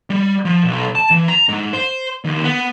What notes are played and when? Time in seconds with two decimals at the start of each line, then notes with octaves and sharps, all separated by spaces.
0.10 G3
0.45 F3
0.65 B1
0.95 A5
1.11 E3
1.28 A#5
1.49 G#2
1.73 C5
2.24 D#2
2.44 B3